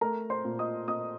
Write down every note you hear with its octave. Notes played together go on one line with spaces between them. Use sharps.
A3 A#4 A#5
C5 C6
A#2
D#5 D#6
A#2 D#5 D#6